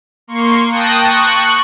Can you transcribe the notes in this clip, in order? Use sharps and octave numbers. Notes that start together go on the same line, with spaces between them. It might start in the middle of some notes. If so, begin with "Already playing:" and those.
A#3 C6 C#6
G5 A5 D#6 F#6 A#6
C#6 F#6